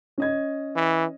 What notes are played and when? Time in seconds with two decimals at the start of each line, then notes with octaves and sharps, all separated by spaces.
0.18 C#4 D#5 G#6
0.76 E3